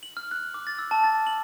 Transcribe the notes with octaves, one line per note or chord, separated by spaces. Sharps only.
F#7
F6
F#6
D6
A6
E6
A5
A6
F#7